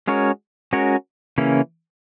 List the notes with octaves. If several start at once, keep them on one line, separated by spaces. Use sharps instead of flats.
G#3 C#4 F#4 A#4 C#5
G#3 C#4 F#4 A#4 C#5
C#3 E3 A#3 C#4 E4